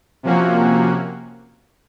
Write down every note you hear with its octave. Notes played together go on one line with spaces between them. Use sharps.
C3 F3 A#3 C#4 F#4